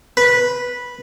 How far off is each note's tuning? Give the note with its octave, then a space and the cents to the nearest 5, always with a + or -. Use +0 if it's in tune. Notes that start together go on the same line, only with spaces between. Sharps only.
B4 -10